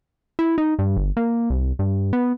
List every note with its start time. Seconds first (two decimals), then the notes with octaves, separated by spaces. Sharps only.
0.39 E4
0.58 D#4
0.79 G2
0.97 G1
1.17 A#3
1.50 C2
1.79 G2
2.13 B3